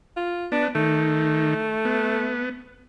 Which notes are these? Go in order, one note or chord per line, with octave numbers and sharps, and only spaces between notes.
F4
B3 D4
D#3 A3
B3